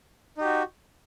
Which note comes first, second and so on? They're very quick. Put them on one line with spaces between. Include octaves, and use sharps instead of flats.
D#4 G4 F#4